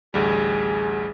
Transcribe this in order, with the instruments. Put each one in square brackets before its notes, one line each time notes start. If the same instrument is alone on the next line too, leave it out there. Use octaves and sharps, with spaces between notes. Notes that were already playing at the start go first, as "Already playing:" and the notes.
[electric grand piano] A1 D2 G3 [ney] G#4